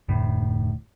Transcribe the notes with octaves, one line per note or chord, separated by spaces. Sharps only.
F1 D2 A2